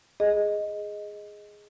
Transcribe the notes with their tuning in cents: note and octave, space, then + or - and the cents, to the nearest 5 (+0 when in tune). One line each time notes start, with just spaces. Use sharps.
G#4 +0 D#5 +0